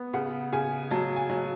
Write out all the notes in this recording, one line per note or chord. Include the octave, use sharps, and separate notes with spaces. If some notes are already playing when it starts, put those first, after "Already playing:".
Already playing: B3
C#3 F#5
C#3 G#5
F#3 A5
G#5
F#3